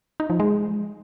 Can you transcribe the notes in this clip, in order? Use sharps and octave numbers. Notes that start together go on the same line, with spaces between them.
D#4
F3
G#3